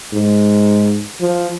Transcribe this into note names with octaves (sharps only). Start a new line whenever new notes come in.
G#2
F3